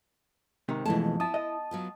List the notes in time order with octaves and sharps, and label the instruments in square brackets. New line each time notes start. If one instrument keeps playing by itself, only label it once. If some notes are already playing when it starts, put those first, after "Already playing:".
[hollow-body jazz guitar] G#2 C3 D#3
[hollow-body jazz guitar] F2 [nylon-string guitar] B2 G#3 A5 [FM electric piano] E3 A3
[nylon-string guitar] E4 [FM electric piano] A5 D#6
[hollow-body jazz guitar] D#5
[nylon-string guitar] F#3 B3 F4